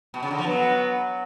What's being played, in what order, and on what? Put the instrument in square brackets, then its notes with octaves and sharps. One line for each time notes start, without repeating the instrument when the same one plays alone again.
[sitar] B2
C#3
D3
F3
[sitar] F#3 [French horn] B3